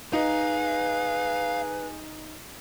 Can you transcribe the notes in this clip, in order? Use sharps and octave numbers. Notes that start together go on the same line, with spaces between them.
D#4 G#4 B4 F5